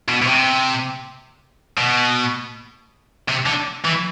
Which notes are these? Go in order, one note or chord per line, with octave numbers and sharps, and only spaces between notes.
B2
B2
C3
B2
C3
D3
E3